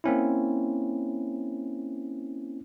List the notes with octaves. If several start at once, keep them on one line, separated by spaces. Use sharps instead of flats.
A#3 C4 C#4 E4